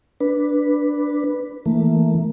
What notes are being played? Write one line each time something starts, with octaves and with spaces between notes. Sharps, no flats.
D4 B4
E3 A3 A#3